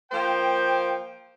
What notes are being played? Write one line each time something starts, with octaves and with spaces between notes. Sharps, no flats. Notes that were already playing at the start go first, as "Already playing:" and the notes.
F3 A#3 C5 G5